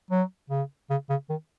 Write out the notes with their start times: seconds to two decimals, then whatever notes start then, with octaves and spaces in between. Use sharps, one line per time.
0.11 F#3
0.50 C#3
0.90 C#3
1.10 C#3
1.29 D#3